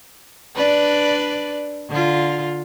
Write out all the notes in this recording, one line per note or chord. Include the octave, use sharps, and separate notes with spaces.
D4 B4 D5
D3 F4